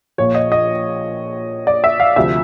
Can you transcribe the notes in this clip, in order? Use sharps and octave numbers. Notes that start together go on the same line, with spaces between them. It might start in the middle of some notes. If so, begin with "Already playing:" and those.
A#1 A#2 F3 C#5
D#5
D#5
D5
E5
F5
D2 C3 F3 E5